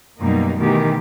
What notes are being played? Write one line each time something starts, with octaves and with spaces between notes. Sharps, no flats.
F#2 B2 G3 A#3 D#4
B2 D#3 E3 A3 G4